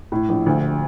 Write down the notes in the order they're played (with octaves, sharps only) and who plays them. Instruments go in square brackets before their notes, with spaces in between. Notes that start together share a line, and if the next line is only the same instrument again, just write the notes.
[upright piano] A2
A#1
D2